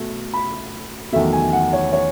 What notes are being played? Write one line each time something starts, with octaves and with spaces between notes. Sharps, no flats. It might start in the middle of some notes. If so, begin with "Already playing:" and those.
Already playing: B2 A3
B5
E2 D#3 F#3 A3 E5
G#5
F#5
C#5
C#5